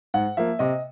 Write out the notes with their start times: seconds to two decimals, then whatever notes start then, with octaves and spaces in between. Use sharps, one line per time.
0.14 G#2 F#5
0.37 F3 A#3 E5
0.59 C3 D#5